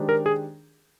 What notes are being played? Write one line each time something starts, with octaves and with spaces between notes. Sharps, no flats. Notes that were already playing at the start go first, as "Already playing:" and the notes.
Already playing: D#3 G#3 D4 G4 C5
A#4
G#4